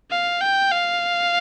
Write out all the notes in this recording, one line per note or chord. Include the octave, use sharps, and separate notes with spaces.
F5
G5
F5